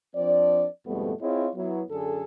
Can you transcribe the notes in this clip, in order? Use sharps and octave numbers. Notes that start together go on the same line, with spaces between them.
F3 C4 D4 D5
F2 G#2 B2 G3 A3 B3
C4 E4 F4 G#4 C#5 D#5
F#3 B3 E4
F#2 D3 G#4 A4